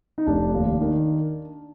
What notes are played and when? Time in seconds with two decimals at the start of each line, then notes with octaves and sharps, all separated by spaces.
0.18 D#4
0.27 F1 D4
0.54 D#2
0.81 D#3